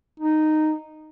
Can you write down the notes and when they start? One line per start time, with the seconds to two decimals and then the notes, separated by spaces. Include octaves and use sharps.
0.20 D#4